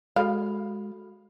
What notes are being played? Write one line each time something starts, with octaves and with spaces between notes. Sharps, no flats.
G#3 F#4 A4 F5 B5